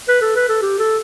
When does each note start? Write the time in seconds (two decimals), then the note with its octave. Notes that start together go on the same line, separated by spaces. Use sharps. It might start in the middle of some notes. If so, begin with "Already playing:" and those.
0.09 B4
0.22 A4
0.36 B4
0.49 A4
0.62 G4
0.79 A4